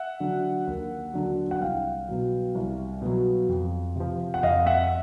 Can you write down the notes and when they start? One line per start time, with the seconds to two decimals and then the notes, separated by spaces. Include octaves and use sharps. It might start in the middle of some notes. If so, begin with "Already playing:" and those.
Already playing: E5 F#5
0.20 D3 F#3
0.67 D#2
1.14 D3 F#3
1.51 F#5
1.61 C2 F5 G5
2.08 B2 F#3
2.55 C2
3.02 B2 F#3
3.49 F2
3.96 C3 F3
4.34 F#5
4.43 F2 D#5 F5
4.66 E5 F#5